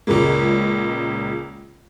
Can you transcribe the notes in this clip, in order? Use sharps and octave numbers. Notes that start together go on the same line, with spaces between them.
C#2 A#2 C#3 G#3 A#3